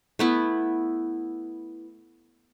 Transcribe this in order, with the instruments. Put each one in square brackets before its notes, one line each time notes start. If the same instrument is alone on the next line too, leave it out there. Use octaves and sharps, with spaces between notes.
[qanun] A3 B3 E4